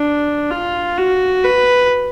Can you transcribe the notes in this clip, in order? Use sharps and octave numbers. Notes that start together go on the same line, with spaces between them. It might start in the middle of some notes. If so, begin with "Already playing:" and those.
Already playing: D4
F4
F#4
B4